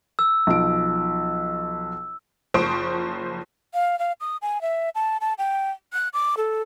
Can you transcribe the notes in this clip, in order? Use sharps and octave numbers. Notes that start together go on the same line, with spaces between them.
E6
B1 F3 D7
F#1 F3 C5 C#6 D#6 D7
F5
F5
D#6
G#5
E5
A5
A5
G5
F#6
D6
A4